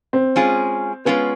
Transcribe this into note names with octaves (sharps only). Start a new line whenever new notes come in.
C4
G#3 C#4 F4 G#4
G#3 B3 C#4 F4 G#4